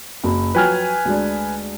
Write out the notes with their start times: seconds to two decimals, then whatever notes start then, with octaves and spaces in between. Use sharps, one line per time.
0.24 F#1
0.55 F3 F#3 B4 G5 G#5 F6
1.05 D2 G#3 D4